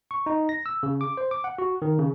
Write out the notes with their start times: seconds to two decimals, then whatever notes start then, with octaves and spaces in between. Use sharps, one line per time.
0.11 C#6
0.26 D#4
0.49 A#6
0.66 E6
0.83 C#3
1.01 D6
1.17 C5
1.31 D6
1.44 F#5
1.58 F#4
1.82 D#3
1.98 C#3